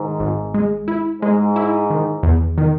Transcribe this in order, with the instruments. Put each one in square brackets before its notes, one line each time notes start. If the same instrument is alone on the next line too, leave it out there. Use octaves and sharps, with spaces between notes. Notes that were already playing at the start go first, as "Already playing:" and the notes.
Already playing: [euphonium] G#2 [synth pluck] D#3
[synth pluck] G#1
G#3
E4
[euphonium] G#2 [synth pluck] G#3
[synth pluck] E4
D#3
E2
D#3